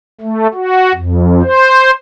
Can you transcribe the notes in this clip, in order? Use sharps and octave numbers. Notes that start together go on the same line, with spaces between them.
A3
F#4
F2
C5